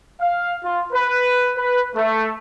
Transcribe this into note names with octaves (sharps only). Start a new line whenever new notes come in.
F5
F4
B4
B4
A3